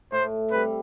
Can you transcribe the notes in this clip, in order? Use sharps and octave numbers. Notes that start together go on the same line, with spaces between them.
A2 C5
G3 C4 B4